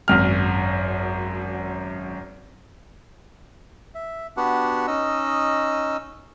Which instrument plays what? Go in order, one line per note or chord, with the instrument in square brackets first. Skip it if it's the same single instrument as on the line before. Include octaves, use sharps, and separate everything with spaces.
[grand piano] G#1 F#2 F6
[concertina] E5
B3 D4 F#4 G4 B4 F#5
C#4 D#4 D#5 E6